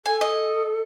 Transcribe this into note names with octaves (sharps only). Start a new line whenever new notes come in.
A4 G#5
D#5